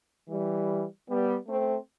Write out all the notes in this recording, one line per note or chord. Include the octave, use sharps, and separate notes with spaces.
E3 G3
G3 B3
A3 C4